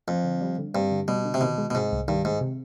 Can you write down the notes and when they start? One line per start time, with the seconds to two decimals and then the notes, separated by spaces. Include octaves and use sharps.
0.08 F2 C4
0.24 D3
0.41 G3
0.58 D3
0.74 G2 C4
0.91 D3
1.08 B2 G3
1.24 D3
1.34 C3
1.41 B2 D#3
1.58 G#3
1.70 B2
1.75 G#2 C3
1.92 C2
2.08 G2 D#3
2.25 G#2 G#3
2.41 C3